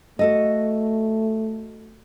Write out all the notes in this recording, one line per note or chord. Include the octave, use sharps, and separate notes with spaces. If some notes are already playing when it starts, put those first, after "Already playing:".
A3 F#4 A4 D#5